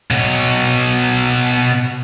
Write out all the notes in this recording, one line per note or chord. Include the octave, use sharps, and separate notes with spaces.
B2 C#5